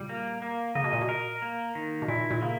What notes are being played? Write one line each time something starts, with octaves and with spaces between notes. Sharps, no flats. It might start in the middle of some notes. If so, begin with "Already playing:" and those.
Already playing: A#2 C#3 G3
A#3
A#3
C#3 D#5
B2
A#2
B2
A#4
A#3
D#3
B2
A#2 E4
A#2
C#3 A#3